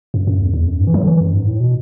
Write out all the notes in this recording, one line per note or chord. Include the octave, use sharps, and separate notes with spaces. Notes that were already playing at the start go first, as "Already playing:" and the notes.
F#2
F#2
E2
E2
F#2
G#2
E3
F#3
D3
E3
F#2
G#2
A2
B2